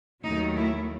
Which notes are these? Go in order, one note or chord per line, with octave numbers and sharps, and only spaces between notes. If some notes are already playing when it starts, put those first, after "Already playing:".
D#2 D#3 F#3 A3 D#4
E4